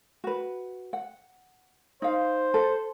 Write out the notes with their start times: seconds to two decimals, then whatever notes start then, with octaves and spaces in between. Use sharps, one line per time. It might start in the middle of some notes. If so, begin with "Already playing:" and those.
0.24 F#4 B4
0.93 F#5
2.02 D#4 C5 F5
2.54 A4